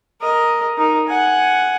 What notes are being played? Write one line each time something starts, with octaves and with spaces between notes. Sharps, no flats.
A#4 D#5
D#4 A#4
F#5 G#5